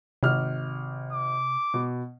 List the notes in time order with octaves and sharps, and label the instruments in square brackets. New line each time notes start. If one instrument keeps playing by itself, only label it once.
[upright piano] G#1 F6 [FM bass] C3
[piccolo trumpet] D6
[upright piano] B2